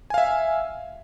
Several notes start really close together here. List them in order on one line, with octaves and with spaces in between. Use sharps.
G#5 F5 E5